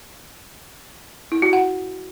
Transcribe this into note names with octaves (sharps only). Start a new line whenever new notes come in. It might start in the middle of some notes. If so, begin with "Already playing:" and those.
E4
F#4
F#5